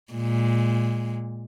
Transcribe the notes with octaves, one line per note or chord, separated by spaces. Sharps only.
A#2 G#3